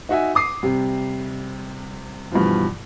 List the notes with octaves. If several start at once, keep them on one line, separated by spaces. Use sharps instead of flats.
D#4 F#4 E5 G#5
D6 D#6 C7
C3 G3
G2 B2 E3 F3